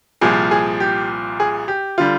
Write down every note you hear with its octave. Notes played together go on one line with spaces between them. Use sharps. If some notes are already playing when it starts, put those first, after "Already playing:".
C2 A#2 F3 G#4
G#4
G4
G#4
G4
D3 G3 F4